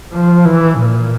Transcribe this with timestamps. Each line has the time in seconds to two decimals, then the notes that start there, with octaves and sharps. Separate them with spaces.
0.13 F3
0.46 E3
0.79 A#2